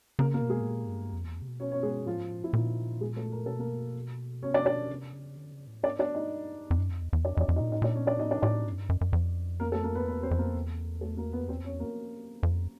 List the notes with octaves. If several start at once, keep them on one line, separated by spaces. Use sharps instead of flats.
C#3 A#3 A#4
A#3 A#4
B2
G#3 G#4
A2
A#2
G#2
G2
F2
E2
F2
C3
B2
C#4 C#5
C#4 C#5
G#3 G#4
A2 F3 F4
G#2
A2
E4
A#2 D#3 D#4
G#3 G#4
A3 A4
A#4
B2 A4
A#3 A#4
C3 C#4 C#5
D4 D5
B2 D4 D5
C3
C#3
D3
C#3
A2
G#2 D4 D5
D4 D5
D#4 D#5
F2
F#2
F2
E2
E2
F2 D4 D5
F2 D#5
D4 D5
F2
D#4 D#5
A#2
A2 D#4 D#5
A#2 D4 D5
C#4 C#5
D4 D5
A2 D#4 D#5
D4 D5
A2 D4 D5
G#2
F#2
G2
F#2
F#2
F2
A#3 A#4
A3 A4
A#3 A#4
B3 B4
E2 B3 B4
C4 C5
F2
A#3 A#4
E2
A3 A4
A#3 A#4
B3 B4
F2
E2 C4 C5
F2 C#4 C#5
E2
A#3 A#4
F2